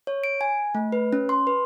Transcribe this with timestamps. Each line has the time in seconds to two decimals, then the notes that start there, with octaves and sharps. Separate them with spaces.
0.07 C#5
0.24 D7
0.41 G#5
0.75 A3
0.92 B4
1.13 C#4
1.29 C6
1.47 B4